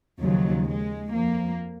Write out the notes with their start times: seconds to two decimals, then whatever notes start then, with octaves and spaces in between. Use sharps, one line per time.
0.20 D#2 C#3 F3 F#3
0.66 G#3
1.12 F2 F3 A#3